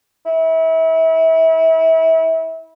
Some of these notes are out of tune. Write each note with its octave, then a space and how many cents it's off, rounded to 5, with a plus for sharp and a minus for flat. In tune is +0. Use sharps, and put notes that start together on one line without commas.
E4 -30